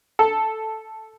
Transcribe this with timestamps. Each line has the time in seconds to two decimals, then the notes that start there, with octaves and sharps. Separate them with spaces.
0.19 A4